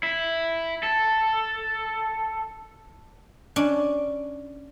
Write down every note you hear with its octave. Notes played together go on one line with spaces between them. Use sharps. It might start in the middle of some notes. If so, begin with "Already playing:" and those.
E4
A4
C#4 D4